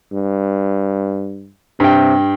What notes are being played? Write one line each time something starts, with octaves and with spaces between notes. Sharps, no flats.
G2
G2 C3 G5